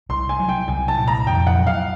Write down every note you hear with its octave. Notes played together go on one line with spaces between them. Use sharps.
C2 C6
G#5
F#3
G5
C2 G#5
A5
A#2
A#5
F2 G5
F#5
F#3
F5